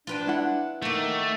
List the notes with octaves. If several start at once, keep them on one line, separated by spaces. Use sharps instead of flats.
D4 F4 B4 G5
E4 F#5
D#3 A3 A#3 F#4